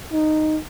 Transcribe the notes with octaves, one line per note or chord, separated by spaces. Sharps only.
D#4